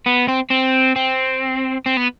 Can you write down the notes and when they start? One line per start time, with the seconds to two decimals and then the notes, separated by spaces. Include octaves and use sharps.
0.06 B3
0.28 C4
0.50 C4
0.96 C4
1.86 C4
1.97 B3